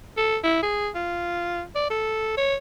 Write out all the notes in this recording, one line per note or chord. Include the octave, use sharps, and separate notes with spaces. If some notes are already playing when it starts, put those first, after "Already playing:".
A4
E4
G#4
F4
D5
A4
C#5